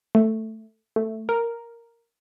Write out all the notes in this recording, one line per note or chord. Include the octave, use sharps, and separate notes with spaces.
A3
A3
A#4